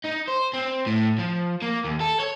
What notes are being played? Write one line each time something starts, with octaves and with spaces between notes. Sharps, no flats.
D#4
C5
C4
A2
F3
A#3
D#2
A4
C#5